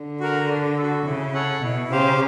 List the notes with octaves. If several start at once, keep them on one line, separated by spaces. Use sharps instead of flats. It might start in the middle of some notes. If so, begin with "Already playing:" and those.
Already playing: D3
F#4 A#4
D4
F#4 A4
C#3 E4
A4 C#5 F#5
B2 E4
C#3 G4 C5 F5